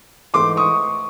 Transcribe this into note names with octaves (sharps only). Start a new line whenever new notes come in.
G#2 E3 A3 C6 D6
C#6 D#6